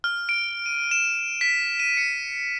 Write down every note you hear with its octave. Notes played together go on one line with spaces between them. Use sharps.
F6
D7
D#7
E7
B6
D#7
C#7